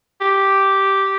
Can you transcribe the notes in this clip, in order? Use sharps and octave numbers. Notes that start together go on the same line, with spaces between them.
G4